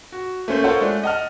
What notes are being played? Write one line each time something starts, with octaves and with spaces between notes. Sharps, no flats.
F#4
A3 A#3 C#4 C5
F4 A4 A#4 C5 C#5 F#5
G#3 A3 D4
D#5 F#5 A5 F6